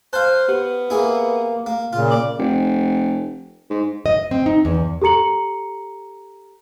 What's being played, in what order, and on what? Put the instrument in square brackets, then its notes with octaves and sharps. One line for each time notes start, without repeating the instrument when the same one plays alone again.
[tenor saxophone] C5 [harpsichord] F5 A5 [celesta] F#6
[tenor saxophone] B3 [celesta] G4
[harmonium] A#3 [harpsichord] E4 G#4
[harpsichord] A#3
[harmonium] A#2 C#3 [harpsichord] F4
[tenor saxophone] D5
[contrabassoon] F1
G#2
[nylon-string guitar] D#5
C4
D#4
E2
[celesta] G4 A4 A#5 C#7 F#7